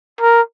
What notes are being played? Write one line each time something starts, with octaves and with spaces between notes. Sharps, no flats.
A#4